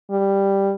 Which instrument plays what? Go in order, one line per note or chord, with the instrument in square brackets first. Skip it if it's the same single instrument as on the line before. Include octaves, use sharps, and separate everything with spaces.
[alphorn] G3